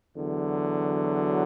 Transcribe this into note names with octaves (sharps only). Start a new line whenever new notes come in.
E2 D3 F#3